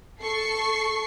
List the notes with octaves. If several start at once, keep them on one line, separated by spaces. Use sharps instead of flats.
A4 C#6 C7